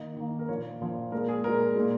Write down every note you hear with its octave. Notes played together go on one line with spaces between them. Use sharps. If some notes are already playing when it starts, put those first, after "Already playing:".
Already playing: D#3 A#3 D#5
D#3 A#3
A#4
A#2 F3 A#3 C#5
A#2 F3 A#3
A#2 G#3 A#4
G#4
A#2 G#3 A#4
A#2 G#3